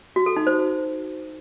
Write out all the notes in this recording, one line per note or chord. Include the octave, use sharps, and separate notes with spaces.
F#4
A4
D#4
C5